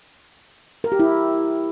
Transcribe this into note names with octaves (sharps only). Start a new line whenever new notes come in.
A#4
G4
E4